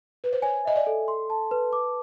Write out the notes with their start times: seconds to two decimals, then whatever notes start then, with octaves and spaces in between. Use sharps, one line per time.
0.24 B4
0.33 C5
0.42 C#5 G#5
0.65 D#5 E5
0.76 D5
0.87 A4
1.08 C6
1.30 A5
1.51 B4
1.73 D6